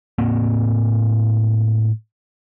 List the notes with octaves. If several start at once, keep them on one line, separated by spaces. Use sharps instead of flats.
A2 A#3 C4